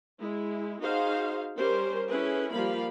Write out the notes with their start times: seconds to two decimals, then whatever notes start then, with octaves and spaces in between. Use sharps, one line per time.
0.21 G#3 E4
0.82 D#4 F#4 G#4 C5 F5
1.56 G3 C#4 G4 A#4 C5
2.09 C#4 E4 G#4 A4 B4
2.53 F3 G3 A#3 F5 B5